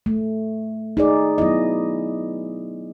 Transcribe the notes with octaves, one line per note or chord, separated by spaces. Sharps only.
A3
D#4 G#4 D5
F#3 B3 E4 D#5